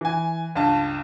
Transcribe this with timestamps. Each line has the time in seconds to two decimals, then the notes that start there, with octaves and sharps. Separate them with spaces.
0.01 E3 G#5
0.55 C#2 G2 A5